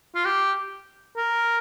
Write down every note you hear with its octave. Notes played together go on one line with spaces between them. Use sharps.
F4
G4
A#4